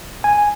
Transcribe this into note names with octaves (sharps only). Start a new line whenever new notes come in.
G#5